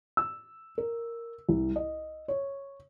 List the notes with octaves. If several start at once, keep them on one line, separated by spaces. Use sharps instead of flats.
E6
A#4
C2
D#5
C#5